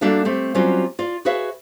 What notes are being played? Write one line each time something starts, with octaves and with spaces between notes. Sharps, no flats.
G3 A#3 D4 F#4 A4 E5
A3 C4 G4
F#3 G3 C4 C#4 F4 F#4
F4 D5
F#4 G#4 B4 C#5 E5 F5